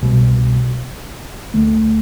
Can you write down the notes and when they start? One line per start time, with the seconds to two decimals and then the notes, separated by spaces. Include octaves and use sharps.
0.01 C2 B2 G3
1.54 D2 D3 A3